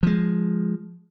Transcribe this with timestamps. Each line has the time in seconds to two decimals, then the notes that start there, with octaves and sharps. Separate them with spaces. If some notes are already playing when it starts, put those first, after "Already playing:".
0.03 F3 G#3